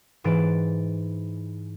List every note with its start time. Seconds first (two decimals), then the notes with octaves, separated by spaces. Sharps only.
0.24 G#2 E3 A6 D7